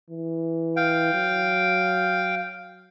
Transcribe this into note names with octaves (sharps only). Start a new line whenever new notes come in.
E3
F5 G5
F#3